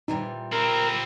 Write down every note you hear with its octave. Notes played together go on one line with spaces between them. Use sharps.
A#2 E3 G3 D#4
C4 E4 A#4